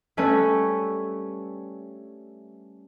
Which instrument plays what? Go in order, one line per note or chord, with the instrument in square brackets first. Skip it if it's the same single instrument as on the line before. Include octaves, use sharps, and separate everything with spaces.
[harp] G3 A3 C#4 B4 C#5